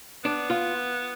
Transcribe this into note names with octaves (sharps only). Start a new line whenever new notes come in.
B3 D4
F4